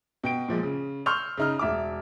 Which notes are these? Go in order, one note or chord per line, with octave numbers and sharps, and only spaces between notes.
B2 G5 D7
A#2 F3 G#3
C#3
C6 C#6 E6 F6 G6 F7
C#3 D#4 F6
E1 E5 D6